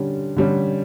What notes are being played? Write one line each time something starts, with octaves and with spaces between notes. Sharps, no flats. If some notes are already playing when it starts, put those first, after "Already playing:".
Already playing: D3 G3 C#4
D3 G3 C#4